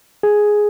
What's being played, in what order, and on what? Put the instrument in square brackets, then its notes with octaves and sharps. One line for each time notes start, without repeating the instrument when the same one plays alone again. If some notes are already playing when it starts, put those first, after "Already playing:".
[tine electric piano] G#4